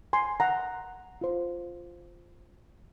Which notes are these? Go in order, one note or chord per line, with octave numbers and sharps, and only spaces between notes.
G#5 C6
F#5 A#5
F4 C5